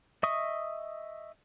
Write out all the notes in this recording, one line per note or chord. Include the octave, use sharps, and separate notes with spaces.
D#5 E5 C#6 D#6